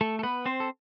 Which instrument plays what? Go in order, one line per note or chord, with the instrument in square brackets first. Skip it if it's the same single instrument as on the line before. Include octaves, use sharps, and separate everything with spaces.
[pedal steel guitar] A3 A4
A4
B3 B4
C4 C5
A4